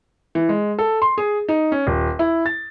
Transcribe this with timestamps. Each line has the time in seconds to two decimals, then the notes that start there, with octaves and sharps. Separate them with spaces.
0.35 E3
0.49 G#3
0.79 A4
1.02 C6
1.18 G#4
1.48 D#4
1.72 C#4
1.87 D#1
2.19 E4
2.46 A6